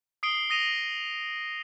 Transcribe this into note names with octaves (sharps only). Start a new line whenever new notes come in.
D#6 C7 D7 G7
D#6 A#6 D#7 F7